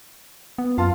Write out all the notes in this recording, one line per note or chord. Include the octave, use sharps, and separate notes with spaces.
B3
F#2 F4 F5 A5